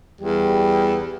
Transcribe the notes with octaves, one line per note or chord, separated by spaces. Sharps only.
E2 G3